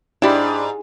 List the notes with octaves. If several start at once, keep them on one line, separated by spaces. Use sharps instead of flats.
G#2 D4 E4 G4 D5 B5